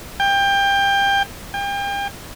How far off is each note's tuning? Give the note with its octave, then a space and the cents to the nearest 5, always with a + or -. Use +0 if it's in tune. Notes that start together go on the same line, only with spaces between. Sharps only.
G5 +20
G5 +35